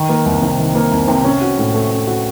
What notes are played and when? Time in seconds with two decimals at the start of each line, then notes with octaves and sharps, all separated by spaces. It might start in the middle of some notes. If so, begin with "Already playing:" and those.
Already playing: D#3
0.09 A#3
0.26 C2
0.42 C3
0.59 D#3
0.75 A#3
0.92 C2
1.08 C3
1.24 C#4
1.41 F#4
1.58 A2
1.74 A3
1.91 C#4
2.07 F#4